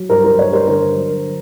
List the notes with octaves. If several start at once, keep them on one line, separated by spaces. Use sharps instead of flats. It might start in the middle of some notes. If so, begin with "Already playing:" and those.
Already playing: F#3
G2 A#4 C5
A#4 C5
G2 B4 C#5
A#4 C5
D3 A#4 C5
F#3